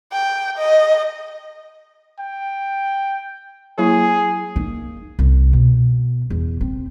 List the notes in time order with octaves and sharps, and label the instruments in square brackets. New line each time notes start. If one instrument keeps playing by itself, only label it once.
[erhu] G5
D#5
[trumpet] G5
[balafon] F#3 A#3 E4 [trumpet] G#4
[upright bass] A#3 D#4
C2
B2
E2
C4